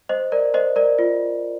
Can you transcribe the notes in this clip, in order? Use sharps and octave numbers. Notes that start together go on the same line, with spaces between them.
C5 D#5
A#4 D5
C5 D#5
A#4 D5
F4